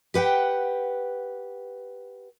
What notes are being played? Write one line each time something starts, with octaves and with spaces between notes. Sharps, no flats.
G4 B4 F#5 G5